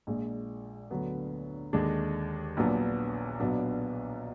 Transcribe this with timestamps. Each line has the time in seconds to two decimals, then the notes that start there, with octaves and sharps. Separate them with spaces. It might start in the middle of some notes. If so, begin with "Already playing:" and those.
0.07 A#1 A#2 G#3
0.91 D2 D3 F#3 B3
1.73 D#2 D3 G#3 D4
2.57 A#1 A#2 F#3 B3 D4
3.40 B1 A#2 F#3 B3 D4